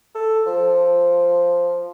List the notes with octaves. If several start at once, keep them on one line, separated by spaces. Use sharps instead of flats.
A4
F3